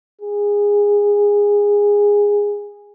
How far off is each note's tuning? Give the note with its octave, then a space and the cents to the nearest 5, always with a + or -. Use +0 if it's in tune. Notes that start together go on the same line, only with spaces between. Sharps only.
G#4 -15